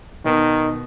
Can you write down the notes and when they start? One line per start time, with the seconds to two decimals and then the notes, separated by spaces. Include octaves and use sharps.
0.25 B2 D#3